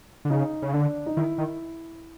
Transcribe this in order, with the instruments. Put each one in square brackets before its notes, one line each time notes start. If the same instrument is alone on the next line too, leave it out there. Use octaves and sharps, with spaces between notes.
[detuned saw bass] D3
[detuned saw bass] C#3 [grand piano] D#4
[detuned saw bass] C#3
[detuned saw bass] D3 [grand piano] D4
[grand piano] D#4
[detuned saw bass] D#3 [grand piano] E4
[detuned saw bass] D#3